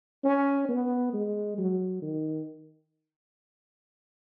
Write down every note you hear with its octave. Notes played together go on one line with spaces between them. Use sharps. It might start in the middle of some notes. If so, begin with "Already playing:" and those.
C#4
B3
G#3
F#3
D#3